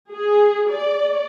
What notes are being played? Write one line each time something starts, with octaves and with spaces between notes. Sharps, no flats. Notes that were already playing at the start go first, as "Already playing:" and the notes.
G#4
D5